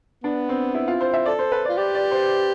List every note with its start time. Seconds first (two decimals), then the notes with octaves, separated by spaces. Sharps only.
0.23 B3 D4
0.49 C4
0.75 E4
0.88 F4
1.01 C5
1.13 E5
1.26 A4 D5
1.39 C5
1.52 B4
1.65 D5
1.69 F4
1.78 G4 D5
1.95 D5
2.11 C5